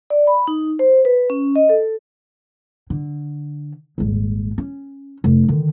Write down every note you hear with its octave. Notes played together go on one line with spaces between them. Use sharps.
D5
B5
D#4
C5
B4
C#4
D#5
A4
D3
D#1 G#1
C#4
F1
D3 D#3